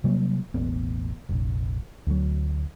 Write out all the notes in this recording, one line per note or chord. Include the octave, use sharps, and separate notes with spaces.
C3 F#3 G3 A#3
E1 A1 B3
F1 A#1
D2 F#3